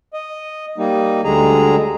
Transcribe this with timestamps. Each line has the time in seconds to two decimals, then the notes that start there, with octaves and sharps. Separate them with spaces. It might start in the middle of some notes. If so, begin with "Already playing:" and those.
0.14 D#5
0.78 G3 A#3 D#4
1.24 D2 D3 G3 G#3 G#4 A#5